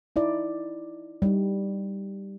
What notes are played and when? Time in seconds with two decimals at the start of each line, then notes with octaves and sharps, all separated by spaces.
0.16 D#4 E4 D5
1.22 G3 D#4